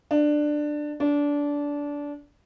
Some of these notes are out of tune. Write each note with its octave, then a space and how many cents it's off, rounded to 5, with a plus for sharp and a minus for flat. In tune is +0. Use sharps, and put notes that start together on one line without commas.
D4 +15
D4 -20